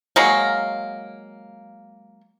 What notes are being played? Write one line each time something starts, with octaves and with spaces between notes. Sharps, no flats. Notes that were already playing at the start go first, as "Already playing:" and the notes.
F#3 G#3 A#3